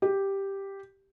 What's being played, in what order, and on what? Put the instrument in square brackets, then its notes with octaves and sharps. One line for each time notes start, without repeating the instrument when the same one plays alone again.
[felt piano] G4